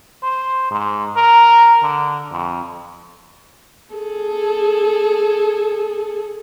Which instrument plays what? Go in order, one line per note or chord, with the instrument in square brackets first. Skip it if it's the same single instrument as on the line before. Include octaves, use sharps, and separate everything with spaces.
[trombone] C5
G#2
A#4
D3
F2
[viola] G#4 A4